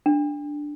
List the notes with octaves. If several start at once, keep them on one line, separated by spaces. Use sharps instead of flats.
D4